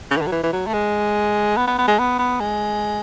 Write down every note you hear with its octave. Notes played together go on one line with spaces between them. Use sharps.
C#3
E3
D3
F#3
E3
E3
F#3
A3
G#3
B3
B3
B3
G#3
B3
B3
G#3